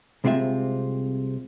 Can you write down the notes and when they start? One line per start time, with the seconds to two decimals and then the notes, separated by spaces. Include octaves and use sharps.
0.24 C2 C3 G#3 C4 F4 E5